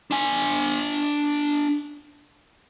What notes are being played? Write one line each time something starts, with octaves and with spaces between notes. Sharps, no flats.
D4 G#5